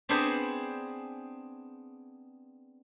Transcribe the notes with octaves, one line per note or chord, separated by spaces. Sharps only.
B3 C4 D4 G#4 B4 C5